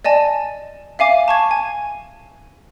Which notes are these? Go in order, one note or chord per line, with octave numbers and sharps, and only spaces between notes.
D5 D#5 G#5 A5
E5 F5 G#5 D6
A5 C#6 G#6
G#5